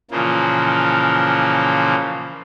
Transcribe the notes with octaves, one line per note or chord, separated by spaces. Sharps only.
A#2 C#3 E3 F3 A#3